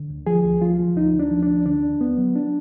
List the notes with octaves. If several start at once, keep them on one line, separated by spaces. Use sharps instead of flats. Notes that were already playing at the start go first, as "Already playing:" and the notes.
Already playing: D3
D2
F3 G#4
D2
F3 F4
F3
D2 D#4
D2
D4
F3
D4
D2
D3 D4
D#2
D3 B3
F#3
D4